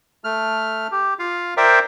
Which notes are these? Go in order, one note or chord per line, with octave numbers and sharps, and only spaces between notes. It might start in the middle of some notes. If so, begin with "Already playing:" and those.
A3 F6
G4
F4 F5
A#4 C5 D5 E5 G5